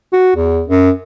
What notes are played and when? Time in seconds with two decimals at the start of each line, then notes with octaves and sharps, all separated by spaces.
0.13 F#4
0.36 E2
0.68 F#2